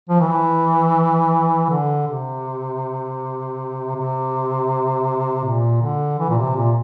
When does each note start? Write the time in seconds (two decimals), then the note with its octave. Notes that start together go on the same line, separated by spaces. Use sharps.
0.09 F3
0.20 E3
1.70 D3
2.08 C3
3.95 C3
5.44 A#2
5.82 D3
6.19 E3
6.29 A#2
6.38 C3
6.56 A#2